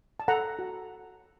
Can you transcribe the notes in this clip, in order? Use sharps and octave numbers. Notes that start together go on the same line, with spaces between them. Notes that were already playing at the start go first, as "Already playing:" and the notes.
A5
A4 F#5 A#5
F#4